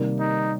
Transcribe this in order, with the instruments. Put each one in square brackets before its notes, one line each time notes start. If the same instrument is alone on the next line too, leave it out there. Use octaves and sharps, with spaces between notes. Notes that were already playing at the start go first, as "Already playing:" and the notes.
Already playing: [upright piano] C3 D#3 G3 A#3
[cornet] D#4